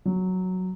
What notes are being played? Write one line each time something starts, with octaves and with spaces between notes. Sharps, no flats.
F#3